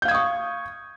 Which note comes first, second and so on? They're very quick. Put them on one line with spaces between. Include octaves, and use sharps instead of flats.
G6 F5 G#6 D#6 C#6